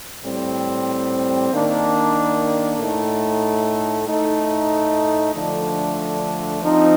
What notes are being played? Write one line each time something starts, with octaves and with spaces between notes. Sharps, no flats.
A2 G3 C4
D#3 A#3 D4
A2 A3 D#4
A2 A3 D#4
D3 F3 A3 D4
F3 C4 D#4